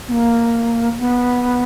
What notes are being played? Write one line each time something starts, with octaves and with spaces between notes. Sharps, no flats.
B3
A#3
B3